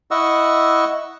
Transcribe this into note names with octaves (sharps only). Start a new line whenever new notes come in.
E4 D#5 F#5 C#6 E6